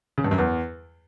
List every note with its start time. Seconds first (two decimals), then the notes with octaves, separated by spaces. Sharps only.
0.18 C#3
0.24 G2
0.31 F#2
0.38 E2